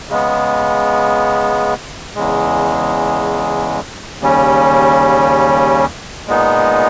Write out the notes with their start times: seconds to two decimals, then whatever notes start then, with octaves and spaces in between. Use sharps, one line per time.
0.09 C#3 G#3 B3
2.15 E2 C#3 G#3
4.21 D#2 C#3 G3 C#4
6.28 A#2 G#3 B3 D#4